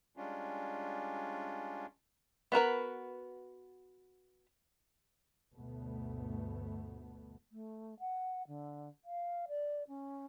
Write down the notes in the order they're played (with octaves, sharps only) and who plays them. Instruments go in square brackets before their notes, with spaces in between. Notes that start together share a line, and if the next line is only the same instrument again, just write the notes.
[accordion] G3 G#3 C#4 D4 F4
[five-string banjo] B3 F#4 A#4 B4
[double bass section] G1 D2 B2 A3 B3
[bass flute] A3
F#5
D3
F5
D5
C#4